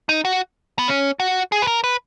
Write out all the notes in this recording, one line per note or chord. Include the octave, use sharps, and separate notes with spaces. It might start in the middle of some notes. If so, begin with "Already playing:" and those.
D#4
F#4
B3
C#4
F#4
G#4
B4
A#4
B4